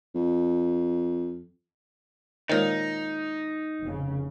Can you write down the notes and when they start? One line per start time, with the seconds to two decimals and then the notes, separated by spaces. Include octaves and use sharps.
0.15 F2
2.50 A#2 D#3 G#3 D#4 C5 C#5
3.81 F1 C#3